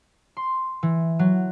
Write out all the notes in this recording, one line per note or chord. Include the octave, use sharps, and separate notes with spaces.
C6
E3
F#3